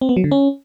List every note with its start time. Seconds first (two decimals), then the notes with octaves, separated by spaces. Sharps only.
0.01 C4
0.09 B3
0.16 F#3
0.24 D3
0.31 C#4